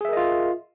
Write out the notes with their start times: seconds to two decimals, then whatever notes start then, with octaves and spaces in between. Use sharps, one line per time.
0.01 G#4
0.05 E5
0.09 A#4
0.13 D#5
0.17 F4